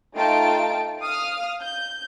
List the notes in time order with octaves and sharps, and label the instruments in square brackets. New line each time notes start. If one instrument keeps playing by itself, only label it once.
[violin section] A3 D#4 F4 G5 A5 D7
F5 D#6 F6
G6